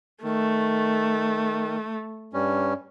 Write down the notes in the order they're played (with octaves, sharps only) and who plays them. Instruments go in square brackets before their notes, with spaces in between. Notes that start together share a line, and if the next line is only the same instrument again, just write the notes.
[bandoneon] D#3 [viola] A3
[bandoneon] G2 G3 C#4